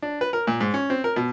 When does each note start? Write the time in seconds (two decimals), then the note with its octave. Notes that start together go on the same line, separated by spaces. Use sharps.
0.02 D4
0.21 B4
0.33 A#4
0.47 A#2
0.61 G#2
0.74 C#4
0.90 C4
1.04 A#4
1.16 B2